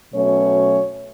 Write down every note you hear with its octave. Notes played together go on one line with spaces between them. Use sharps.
B2 F#3 A3 C#4 C#5